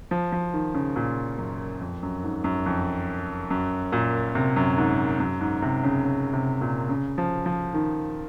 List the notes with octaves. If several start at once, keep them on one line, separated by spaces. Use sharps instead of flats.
F3
F3
D#3
C#3
A#2
F#2
F2
F#2
G#2
F#2
F2
F#2
A#2
C3
F#2
G#2
F#2
G#2
C3
C#3
C#3
C3
A#2
C#3
F3
F3
D#3